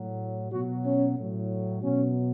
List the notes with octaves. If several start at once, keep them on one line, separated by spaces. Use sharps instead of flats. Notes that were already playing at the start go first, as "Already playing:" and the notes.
Already playing: A2 F#3
B2 F#3 F#4
C#4
A2 F#3
B2 F#3 C#4